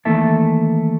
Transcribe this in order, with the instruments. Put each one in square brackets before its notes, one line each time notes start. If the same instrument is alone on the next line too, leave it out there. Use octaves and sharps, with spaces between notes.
[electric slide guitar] D#3 E3 A3 A#3 E5 A5